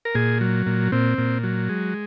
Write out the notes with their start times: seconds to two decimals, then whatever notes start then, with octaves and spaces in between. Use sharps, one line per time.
0.05 A#4
0.15 A#2 G#4
0.41 F#3
0.66 A#2
0.92 A#2 C4
1.18 A#2
1.43 F#3
1.69 G#3